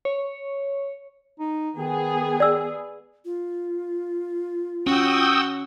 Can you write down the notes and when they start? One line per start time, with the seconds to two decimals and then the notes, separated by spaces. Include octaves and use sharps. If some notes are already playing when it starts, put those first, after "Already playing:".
0.05 C#5
1.40 D#4
1.76 D#3 B3 G#4
2.40 D5 E6
3.24 F4
4.87 C#4 F#4 G5 D#6 E6